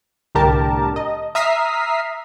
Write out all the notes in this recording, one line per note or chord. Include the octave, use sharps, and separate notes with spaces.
C2 A2 D3 G4 A#4 A5
D#5
E5 A#5 D#6 F6 B6 C7